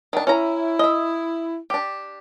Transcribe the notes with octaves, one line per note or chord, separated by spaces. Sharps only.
D#3 D4
C#4 E4 A#5
D#5 E5
D4 G4